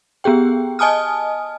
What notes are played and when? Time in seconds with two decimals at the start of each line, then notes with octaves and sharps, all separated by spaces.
0.24 B3 G4 G#4 G5
0.79 D#5 G#5 A5 D#6 F6